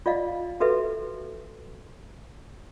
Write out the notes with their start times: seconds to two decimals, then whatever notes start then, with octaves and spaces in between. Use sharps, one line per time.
0.06 F4 D5 D#5 F5
0.60 F#4 A4 B4 E5